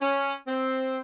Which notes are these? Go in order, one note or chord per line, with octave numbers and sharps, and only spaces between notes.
C#4
C4